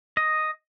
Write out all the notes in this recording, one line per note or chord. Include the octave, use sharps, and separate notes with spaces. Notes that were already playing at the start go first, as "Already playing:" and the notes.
D#5